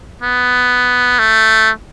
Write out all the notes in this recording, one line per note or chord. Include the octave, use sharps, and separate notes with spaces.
B3
A3